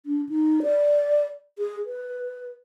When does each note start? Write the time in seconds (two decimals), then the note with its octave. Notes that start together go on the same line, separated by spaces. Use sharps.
0.06 D4
0.29 D#4
0.62 D5
1.59 G#4
1.86 B4